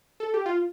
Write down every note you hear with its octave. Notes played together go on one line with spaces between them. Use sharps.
A4
G4
F4